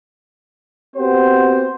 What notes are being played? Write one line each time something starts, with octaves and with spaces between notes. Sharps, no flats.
B3 C4 F#4 G4 C5